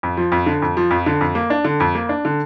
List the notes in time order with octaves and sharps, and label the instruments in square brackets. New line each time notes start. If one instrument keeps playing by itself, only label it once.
[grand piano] F2
F3
F2
D3
F2
F3
F2
D3
F2
A#3
D4
D3
F2
A#3
D4
D3